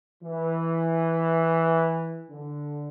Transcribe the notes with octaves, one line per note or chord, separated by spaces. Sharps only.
E3
D3